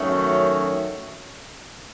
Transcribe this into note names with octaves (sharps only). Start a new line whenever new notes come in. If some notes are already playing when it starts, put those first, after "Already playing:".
Already playing: F#2 D#3 F#3 A3 C#4